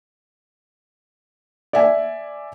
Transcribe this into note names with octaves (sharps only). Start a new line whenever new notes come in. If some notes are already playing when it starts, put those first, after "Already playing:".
D5 E5 G#5